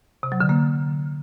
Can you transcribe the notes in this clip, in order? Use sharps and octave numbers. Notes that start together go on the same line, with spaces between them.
C3
F#3
D3
A#3